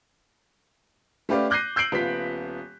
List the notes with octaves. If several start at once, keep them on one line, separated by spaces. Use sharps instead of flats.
A3 C#4 G4 B4 D5 F5
D6 F#6 G6 A#6 C7 D#7
E6 G6 C7 D7 F#7
D#1 B3 F4 B6